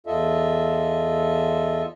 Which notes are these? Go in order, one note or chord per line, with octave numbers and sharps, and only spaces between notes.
E2 F4 A4 D#5 E5